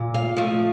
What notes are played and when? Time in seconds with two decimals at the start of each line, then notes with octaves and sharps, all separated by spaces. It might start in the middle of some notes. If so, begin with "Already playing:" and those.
Already playing: A#2
0.14 F5
0.36 F3 A3 D#5